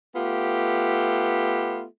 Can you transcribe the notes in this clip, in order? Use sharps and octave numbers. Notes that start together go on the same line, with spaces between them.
A3 B3 F4 G4